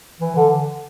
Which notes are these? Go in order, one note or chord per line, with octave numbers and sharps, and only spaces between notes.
E3
D3